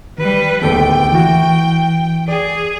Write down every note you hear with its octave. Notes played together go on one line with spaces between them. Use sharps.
D#3 G3 B4
D1 D#2 B3 A4 G5
E3 E4 F#4
G#4 D5